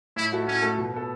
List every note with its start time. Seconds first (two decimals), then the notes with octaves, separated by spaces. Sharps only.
0.16 A2 E4
0.32 A3 F#4 A4
0.47 A2 C#4
0.62 A3 F#4 A4
0.78 B2
0.94 B3 A4